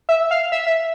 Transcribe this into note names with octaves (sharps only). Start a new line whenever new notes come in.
E5
F5
E5
E5